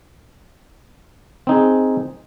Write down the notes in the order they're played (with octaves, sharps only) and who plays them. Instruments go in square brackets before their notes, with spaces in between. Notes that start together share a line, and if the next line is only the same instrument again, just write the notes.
[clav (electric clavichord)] C4 D#4 G#4